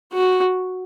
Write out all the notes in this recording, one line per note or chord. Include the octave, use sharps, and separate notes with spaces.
F#4